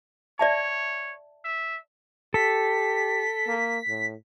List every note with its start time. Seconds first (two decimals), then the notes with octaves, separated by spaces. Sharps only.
0.39 C#5 D5 E5 A5
1.45 E5
2.34 G4 A4 B6
3.47 A#3
3.89 A2